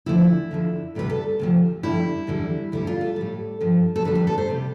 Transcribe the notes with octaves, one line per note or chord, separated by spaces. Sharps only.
D2 D3 F3 E4
F2 D3 F3
D2 C3 G3 B4
A4
D2 C3 F3
F2 D3 G3 E4
E2 D3 G3
D2 D3 G3 E4
F4
A4
A2 G3
G2 F3
A4
F2 D3 G3 B4
B4
A4
C5
C3 G3